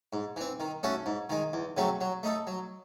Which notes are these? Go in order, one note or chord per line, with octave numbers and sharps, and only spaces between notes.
G#2
E3 C4
D#3
A3 C#4 F#4 A4
G#2
D#3 G#3
E2
C#3 F#3 A3 C4
F#3
A3 D#4 A4
F#3